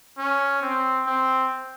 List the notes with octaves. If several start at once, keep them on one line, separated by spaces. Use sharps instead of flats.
C#4
C4
C4